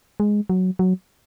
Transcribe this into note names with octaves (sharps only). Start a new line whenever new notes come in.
G#3
F#3
F#3